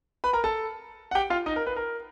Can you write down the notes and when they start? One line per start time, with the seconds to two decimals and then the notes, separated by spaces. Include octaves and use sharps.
0.24 B4 B5
0.33 A#4 A#5
0.44 A4 A5
1.11 F#5
1.15 G4 G5
1.30 F4 F5
1.46 D#4 D#5
1.56 A#4
1.66 B4
1.76 A#4